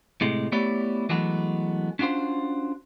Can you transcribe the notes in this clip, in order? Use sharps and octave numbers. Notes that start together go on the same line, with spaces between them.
A2 C3 G#3
A3 B3 E4 G4 C#5 D5
E3 F#3 G#3 A3 B3
C#4 D4 F4 F#4 C5